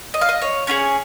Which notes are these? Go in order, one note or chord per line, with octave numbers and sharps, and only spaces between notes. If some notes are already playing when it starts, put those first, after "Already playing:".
D#5
F5
D#5
C#5
C#4 F4 G#4 C#5